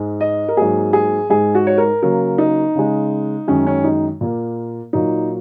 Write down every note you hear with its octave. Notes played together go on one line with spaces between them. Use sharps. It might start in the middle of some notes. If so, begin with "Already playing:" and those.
Already playing: G#2 G#3
D#5
A#4
G#2 F#3 A#3 G#4
G#4
G#2 G#3 G#4
F#4
C#5
A#4
C#3 F#3 A#3 A#4
D#4
C#3 G#3
F#2 D#3 G#3 C#4
C#4
D#4
A#2 A#3
A#2 F#3 A#3 D#4